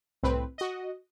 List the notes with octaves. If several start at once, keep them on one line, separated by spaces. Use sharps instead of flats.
C2 A2 C4 B4
F#4 D#5